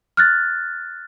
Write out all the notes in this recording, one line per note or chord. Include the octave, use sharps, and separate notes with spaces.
F6 F#6 A6